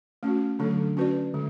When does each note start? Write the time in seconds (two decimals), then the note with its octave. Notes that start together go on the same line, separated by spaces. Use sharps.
0.23 A3 C#4 F#4
0.59 D3 F#3 A3 D4 A4
0.97 C#4 F#4 B4 D5
1.34 D3 G#3